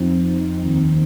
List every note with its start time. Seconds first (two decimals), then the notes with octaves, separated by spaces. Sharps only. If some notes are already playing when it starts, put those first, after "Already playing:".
Already playing: F2 F3 C4 D#4
0.60 D#2 D#3 C4 D#4